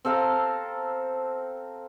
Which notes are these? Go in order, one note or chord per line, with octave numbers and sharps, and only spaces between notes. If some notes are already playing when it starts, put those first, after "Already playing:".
C4 A4 F5 A#5